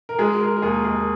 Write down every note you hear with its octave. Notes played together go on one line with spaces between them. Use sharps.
A#4
G#3 G#4
G#3 A#4
A#4
D#2 G#4
D#2 G#4